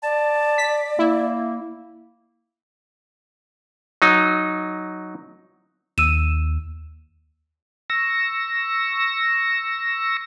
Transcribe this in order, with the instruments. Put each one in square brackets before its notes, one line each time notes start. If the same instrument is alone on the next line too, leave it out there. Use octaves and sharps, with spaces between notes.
[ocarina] D5 [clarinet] A5
[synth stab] B6
[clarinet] A#3 [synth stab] E4
[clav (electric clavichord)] F#3 D#4
[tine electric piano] D#2 [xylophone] E6 D#7 E7
[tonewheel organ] C#6 E6 A#6